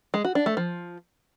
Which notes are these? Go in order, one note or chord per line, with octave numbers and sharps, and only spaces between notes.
G#3
F#4
D4
A3
F3